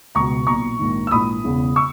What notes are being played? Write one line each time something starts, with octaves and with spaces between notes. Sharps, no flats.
C#2 B2 A#5 C#6
B1 A#2 A#5 C#6
A#1 G#2 D#3
E6
A#1 G#2 E3 B5 D#6
E1 E2 C#3 E3
C#6 E6